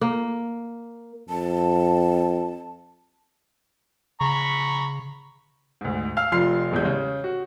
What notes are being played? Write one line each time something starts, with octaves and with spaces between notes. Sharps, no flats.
A#3
F2 A5
C#3 A#5 B5 C#6
D2 G#2
F5 E6 F6
F1 F2 F4 C6 F6 C7
D#1 E2 G#3 G6
C#3
F#4